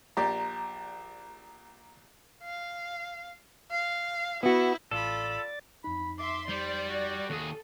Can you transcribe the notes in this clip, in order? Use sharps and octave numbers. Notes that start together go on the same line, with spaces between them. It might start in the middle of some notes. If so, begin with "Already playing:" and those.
A#1 G4 D5 A#5
F5
F5
B3 E4 F#4
A1 F4 A4 D5 B5 A6
F2 D#4 B5
E5 C6 D6
G3 C5 D5
F#4
D#2 G#4 A4